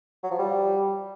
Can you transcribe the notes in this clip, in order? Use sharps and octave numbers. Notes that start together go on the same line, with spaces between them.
F#3
F3
G3